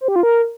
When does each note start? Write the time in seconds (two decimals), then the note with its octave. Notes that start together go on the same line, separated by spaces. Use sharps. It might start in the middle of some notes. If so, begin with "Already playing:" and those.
0.01 C5
0.08 G4
0.16 F4
0.23 A#4